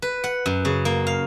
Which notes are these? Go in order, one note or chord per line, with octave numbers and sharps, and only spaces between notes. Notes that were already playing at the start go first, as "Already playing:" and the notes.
B4
F#5
F#2
C#3
A#3
F5